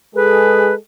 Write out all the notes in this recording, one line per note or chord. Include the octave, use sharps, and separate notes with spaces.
G#3 G#4 A4 B4